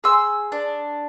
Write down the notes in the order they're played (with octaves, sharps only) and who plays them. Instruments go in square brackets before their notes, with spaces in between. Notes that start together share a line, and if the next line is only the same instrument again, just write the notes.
[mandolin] G#4 C6 E6
D4